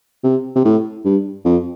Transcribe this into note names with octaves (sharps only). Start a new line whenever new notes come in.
C3
C3
A2
G2
F2